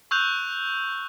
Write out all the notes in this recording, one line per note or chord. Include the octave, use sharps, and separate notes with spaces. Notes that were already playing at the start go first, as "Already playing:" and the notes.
C#6 E6 F#6 G6 F7